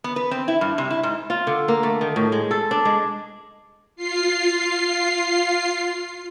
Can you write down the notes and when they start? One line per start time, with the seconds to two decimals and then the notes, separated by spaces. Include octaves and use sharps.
0.04 B3
0.16 B4
0.31 C4
0.48 E4
0.61 G2
0.78 C3
0.90 E4
1.03 G#2
1.30 F4
1.47 D3
1.68 A#3
1.83 A3
2.01 D#3
2.16 A2
2.32 G#3
2.51 A4
2.71 D4
2.85 G#3
3.96 F4 C7